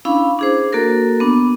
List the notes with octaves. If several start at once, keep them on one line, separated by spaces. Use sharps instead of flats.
C#4 D4 E4 F5 B5
D4 G#4 C5
A#3 F#4 A4 A#4
B3 D4